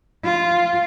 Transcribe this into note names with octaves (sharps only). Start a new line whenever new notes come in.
F4